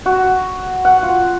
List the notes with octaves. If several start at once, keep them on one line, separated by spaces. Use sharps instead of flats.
F#4
F#5
F4